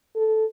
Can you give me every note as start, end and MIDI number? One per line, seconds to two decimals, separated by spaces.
0.16 0.45 69